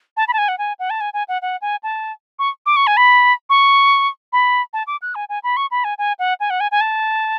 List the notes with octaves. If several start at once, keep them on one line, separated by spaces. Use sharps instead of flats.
A5
B5
A5
G#5
F#5
G#5
F#5
A5
G#5
G#5
F#5
F#5
G#5
A5
C#6
D6
C#6
G#5
B5
C#6
B5
A5
D6
F#6
G#5
G#5
B5
C#6
B5
G#5
G#5
F#5
G#5
F#5
G#5
G#5
A5